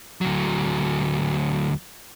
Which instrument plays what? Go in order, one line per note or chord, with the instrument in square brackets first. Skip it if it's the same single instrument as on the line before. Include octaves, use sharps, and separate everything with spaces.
[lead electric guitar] D2 F#3